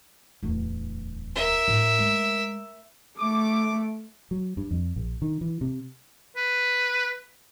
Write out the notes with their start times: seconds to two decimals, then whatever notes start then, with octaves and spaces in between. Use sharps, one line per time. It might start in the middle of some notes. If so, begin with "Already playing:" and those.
0.43 D1 E2
1.36 A#4 E5
1.68 A2
1.99 G#3
3.18 A3 D6
4.31 F#3
4.57 G2
4.71 F2
4.96 A#1
5.22 D#3
5.41 E3
5.61 C3
6.36 B4